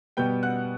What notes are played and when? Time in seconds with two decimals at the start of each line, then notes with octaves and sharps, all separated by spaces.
0.17 B2 G3 B3 G5 G6
0.43 F#5 F#6